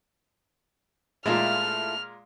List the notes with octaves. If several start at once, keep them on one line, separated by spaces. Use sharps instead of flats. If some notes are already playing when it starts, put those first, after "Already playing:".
A#2 G#3 A3 E4 F4 F6